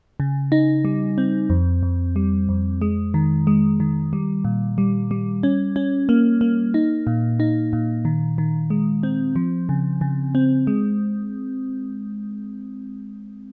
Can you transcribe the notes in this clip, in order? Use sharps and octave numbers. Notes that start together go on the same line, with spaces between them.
C#3
D#4
G3
C4
F2
F2
G3
F2
G#3
D#3
G#3
D#3
G3
A#2
G3
G3
C#4
C#4
A#3
A#3
D#4
A#2
D#4
A#2
D#3
D#3
G#3
C4
F3
C#3
C#3
C4
G#3